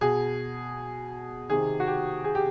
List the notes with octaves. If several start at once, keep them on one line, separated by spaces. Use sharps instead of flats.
B2 G#4
C3 D#3 G#4
F#4
G4
G#4
G4